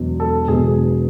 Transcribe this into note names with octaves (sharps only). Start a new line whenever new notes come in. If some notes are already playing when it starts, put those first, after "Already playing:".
Already playing: E1 E2 B2 F#3
A4
E1 E2 B2 F#3 G#4